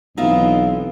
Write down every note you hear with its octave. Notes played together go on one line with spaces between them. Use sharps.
B1 E3 B3 C4 D#4 F4 E5